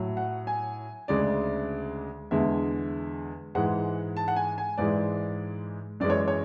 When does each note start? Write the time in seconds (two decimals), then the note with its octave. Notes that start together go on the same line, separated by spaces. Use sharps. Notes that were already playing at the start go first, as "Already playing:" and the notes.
Already playing: A2 F#3
0.17 F#5
0.47 G#5
1.08 D2 C#3 G#3 D5
2.31 E2 D3 G#3 E5
3.55 G#2 E3 G#3 F#5
4.17 A5
4.28 F#5
4.36 G#5
4.58 G#5
4.77 G#2 E3 G#3 D5
6.00 F#2 E3 G#3 D5
6.10 C#5
6.28 C#5